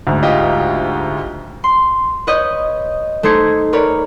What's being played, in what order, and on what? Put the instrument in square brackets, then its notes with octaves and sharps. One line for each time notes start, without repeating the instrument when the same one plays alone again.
[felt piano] D2 G#2
[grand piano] F4 G4 D#5
[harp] C6
B4 C#5 D#5 G6
A3 D#4 C5 G#6 C#7
A#4 B4 C#5 D5